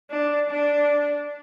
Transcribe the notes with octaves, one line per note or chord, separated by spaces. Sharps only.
D4
D4